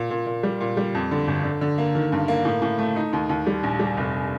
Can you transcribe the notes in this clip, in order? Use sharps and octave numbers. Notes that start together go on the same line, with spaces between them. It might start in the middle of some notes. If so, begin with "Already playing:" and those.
Already playing: A#2
A#2
A#2
G3
A#2
G3
F2
D3
G1
D3
D3
A#3
D#3
G2
A#3
A2
A2
A3
D#4
D#2
D#2
G3
A#1
G3
F1